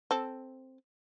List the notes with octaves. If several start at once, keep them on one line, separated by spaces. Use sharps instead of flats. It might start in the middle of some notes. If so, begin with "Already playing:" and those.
C4 A4